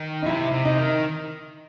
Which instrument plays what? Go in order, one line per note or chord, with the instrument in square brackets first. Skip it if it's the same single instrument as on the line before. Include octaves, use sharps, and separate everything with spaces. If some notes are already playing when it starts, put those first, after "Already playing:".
Already playing: [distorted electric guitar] D#3
[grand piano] D#4
[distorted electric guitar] C3 [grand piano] E4
[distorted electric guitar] C3
[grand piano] D#4
[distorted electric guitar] D#3